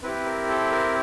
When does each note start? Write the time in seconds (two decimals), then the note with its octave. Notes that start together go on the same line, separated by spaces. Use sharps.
0.03 C4 E4 G4 B4
0.26 A#4
0.48 A4
0.71 A#4